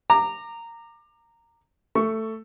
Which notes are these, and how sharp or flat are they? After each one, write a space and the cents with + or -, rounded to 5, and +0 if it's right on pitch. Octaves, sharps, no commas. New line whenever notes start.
A#5 -15 D6 +25
A3 +10 C#6 +10